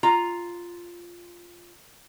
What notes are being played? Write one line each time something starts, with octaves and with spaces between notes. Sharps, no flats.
F4 A#5